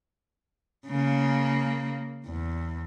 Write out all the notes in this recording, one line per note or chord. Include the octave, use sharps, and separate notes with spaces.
C#3 A#3
E2